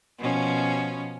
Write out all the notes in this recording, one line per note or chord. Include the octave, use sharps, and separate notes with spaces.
B2 F3 C#4